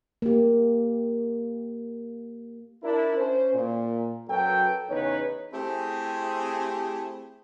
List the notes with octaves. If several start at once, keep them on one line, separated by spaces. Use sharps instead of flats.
A#3 G4
D4 E4 A#4
C#4 C5
A#2
F#2 F#3 A4 B4 G5
E2 C#3 D#4 B4 C#5
A3 C4 E4 G4 G#4